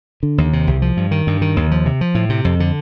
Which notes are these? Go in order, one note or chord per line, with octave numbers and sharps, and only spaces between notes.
D3
D#2
C3
C2
F3
G2
D#3
G2
D#3
D#2
F3
C3
F3
A2
C3
F2
D3